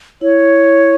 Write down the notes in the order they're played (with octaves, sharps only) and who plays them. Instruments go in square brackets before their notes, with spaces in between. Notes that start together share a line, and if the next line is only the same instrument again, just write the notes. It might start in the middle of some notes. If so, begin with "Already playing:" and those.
[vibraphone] E4 [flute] C#5